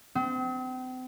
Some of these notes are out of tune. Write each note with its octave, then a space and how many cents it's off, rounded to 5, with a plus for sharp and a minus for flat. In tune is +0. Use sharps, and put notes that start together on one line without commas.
C4 -40